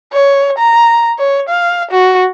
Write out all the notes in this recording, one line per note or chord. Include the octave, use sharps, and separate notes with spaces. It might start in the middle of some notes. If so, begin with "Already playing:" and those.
C#5
A#5
C#5
F5
F#4